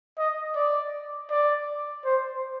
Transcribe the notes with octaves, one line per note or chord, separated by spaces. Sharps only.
D#5
D5
D5
C5